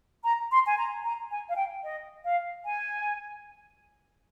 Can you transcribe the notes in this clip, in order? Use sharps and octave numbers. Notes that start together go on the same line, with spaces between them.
A#5
C6
G#5
A#5
A#5
G#5
F5
G5
D#5
F5
G#5